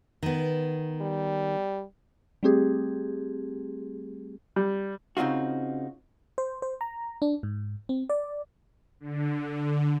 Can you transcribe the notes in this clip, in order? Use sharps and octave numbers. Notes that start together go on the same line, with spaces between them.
D#3 B3
G3
G3 A3 C4 G4 G#4
G3
C#3 C4 D#4 F4 F#4
C5
C5
A#5
D4
G#2
C4
D5
D3